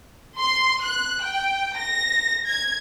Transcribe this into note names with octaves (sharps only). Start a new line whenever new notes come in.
C6
F#6
G5
A#6
G#6